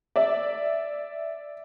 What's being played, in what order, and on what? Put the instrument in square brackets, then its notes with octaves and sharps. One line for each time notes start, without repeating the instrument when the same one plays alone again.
[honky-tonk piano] D5 E5